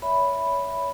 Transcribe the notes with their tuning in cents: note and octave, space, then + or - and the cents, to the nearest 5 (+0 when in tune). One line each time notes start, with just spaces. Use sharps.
C#5 +20 E5 +0 B5 +0